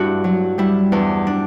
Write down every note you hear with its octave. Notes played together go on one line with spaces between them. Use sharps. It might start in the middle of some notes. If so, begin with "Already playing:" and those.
Already playing: G2 D4 E4 F#4
F#3
G3 E4
E2 D4
D4